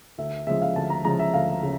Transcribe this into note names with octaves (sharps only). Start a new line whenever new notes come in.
D2 E5
C#3 F3 G#3 E5
F5
D2 A5
A#5
C#3 F3 G#3 A#5
E5
D2 F5
C#3